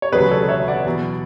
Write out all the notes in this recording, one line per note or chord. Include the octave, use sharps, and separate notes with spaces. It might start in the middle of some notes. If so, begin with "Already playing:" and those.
C#5
E1 D2 C#3 F#3 G#4 B4
A4 C#5
C#5 E5
D5 F#5
E2 B2 F#3